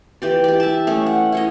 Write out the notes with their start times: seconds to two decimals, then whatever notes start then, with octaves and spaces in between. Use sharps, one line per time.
0.22 E3 G4 D5
0.44 G4 D5
0.60 E5 A5
0.87 A3 C#4
1.06 F#5
1.32 E4 C#5 D#5